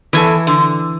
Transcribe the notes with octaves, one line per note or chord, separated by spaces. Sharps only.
E2 E3 D4 A4 G#5
D3